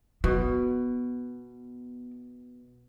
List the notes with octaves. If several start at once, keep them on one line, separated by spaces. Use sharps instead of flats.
B2 B3